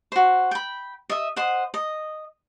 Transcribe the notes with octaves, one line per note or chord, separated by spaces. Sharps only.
F#4 C5
G5 B5
D#5 E5
C5 D#5 F#5
D#5